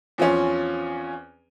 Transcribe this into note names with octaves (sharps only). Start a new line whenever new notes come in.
E2 F3 C4 C#4